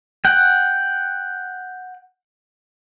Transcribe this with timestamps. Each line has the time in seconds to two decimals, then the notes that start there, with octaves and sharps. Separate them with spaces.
0.25 F#5 G5